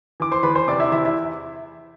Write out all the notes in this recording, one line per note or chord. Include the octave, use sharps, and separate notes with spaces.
E3 D6
C5 C6
E2 B4 B5
C5 C6
C3 D5 D6
E4 E5
E2 E4 E5
E4 E5